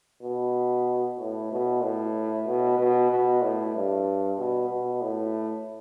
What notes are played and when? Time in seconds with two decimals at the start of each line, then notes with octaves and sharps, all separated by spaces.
0.23 B2
1.19 A2
1.51 B2
1.83 A2
2.47 B2
2.79 B2
3.11 B2
3.42 A2
3.75 G2
4.39 B2
4.69 B2
5.01 A2